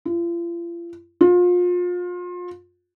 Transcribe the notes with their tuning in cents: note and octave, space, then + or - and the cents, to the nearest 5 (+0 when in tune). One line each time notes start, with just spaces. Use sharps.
F4 -40
F4 +30